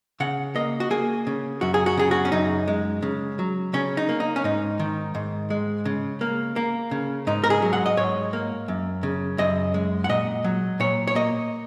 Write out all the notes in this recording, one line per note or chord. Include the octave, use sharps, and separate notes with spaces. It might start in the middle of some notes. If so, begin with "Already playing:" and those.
C#3 F#5
A#3 D#5
F#4
A#3 G#4
C#3
F#2 F#4
G#4
F#4
C#3 G#4
F#4
C#4
F#2 D#4
G#3
C#3
F#3
C#3 C#4
D#4
A#3
D#4
C#4
G#2 D#4
D#3
G#2
G#3
C#3
A#3
A#3
C#3
G#2 D#4
A#4
G#4
F#3
F#5
D#5
G#2 C#5
A#3
F#2
C#3
F#2 D#5
G#3
F#5
A#2 D#5
F#3
A#2 C#5
C#5
A#3 D#5